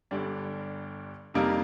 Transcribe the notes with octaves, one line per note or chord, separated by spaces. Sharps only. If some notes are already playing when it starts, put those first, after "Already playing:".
G1 G2 D3 G3 D4
F2 C3 G3 A#3 D#4